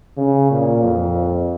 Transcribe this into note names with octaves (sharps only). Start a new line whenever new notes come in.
C#3
A#2
F2